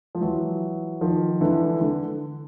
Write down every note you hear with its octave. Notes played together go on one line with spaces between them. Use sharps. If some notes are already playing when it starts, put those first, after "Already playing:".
F3
E3 F#3
D#3 F3
D3 E3
D3